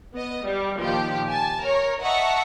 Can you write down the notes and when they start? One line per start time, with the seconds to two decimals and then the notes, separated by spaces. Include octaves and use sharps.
0.14 B3 D#5
0.44 G3
0.80 A#2 D#3 F3 G4
1.28 G#5 A5
1.62 A#4 C#5
2.01 D#5 E5 F#5 A5 A#5 C#6